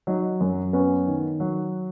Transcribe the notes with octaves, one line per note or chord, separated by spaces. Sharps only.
F#3 D#4
F#2
B3 C#4
D#3
F#3